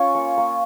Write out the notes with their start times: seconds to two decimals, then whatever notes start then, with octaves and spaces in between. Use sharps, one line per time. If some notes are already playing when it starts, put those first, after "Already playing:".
Already playing: C#4 F4 C#6
0.15 A#3
0.37 A#3